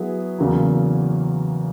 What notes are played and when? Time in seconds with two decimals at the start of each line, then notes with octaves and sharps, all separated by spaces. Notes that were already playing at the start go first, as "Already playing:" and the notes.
Already playing: F#3 B3 E4 G#4 B4
0.39 E2 C#3 F#3 A#3